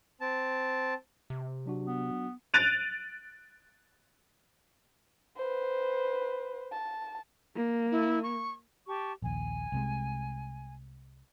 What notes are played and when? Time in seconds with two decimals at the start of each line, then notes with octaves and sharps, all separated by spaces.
0.21 C4 A5
1.30 C3
1.66 F#3 D4 F#4
1.87 B3
2.54 F#6 A6 D7 D#7 F7
5.37 B4 C5
6.72 A5
7.56 A#3
7.91 E4
8.23 C#6
8.87 G4 A5 C#6
9.22 A#1 D#2 G#5
9.72 C2 C3 G#3